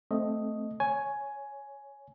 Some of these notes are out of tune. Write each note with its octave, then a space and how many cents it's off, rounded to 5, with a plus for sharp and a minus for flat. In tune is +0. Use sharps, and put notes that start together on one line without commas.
A3 +0 C4 +0 D#5 +0
C#5 +0 G#5 +10